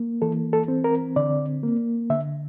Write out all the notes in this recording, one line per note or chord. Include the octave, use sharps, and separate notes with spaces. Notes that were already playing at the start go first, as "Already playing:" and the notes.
Already playing: A#3
E3 A4
A4
C4
A#4
D3 D5
A#3
D3 E5